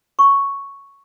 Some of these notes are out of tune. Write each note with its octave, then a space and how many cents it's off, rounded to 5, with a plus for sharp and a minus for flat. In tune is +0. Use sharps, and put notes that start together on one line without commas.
C#6 +0